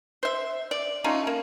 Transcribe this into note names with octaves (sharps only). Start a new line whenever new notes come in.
C5 E5
D5
A3 C#4 D#4 F4
A#3